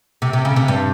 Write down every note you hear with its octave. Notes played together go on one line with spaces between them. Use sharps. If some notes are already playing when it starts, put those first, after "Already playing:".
C3
C3
C#3
C3
G2